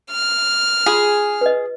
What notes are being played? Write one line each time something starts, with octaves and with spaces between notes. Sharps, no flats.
F6
F4 G#4 C6
B4 D#5